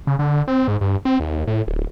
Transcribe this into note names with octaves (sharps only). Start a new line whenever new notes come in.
C#3
D3
C4
G#2
G2
C4
D#2
A2
D1